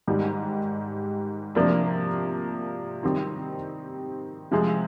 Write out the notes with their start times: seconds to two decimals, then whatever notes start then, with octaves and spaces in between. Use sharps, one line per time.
0.08 G#2 D#3 G3
1.55 C3 F3 A#3 D4
3.03 D#3 G3 C4 D#4
4.51 C3 F3 G#3 C4